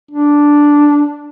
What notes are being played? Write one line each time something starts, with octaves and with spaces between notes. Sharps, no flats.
D4